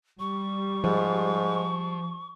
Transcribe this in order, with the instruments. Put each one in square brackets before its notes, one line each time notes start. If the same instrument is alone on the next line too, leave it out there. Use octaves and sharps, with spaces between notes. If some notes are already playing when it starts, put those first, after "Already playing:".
[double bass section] G3 [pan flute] C#6
[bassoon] G#2 [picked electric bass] F3